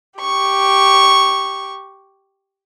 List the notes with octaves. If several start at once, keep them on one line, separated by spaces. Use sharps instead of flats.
G4 C#6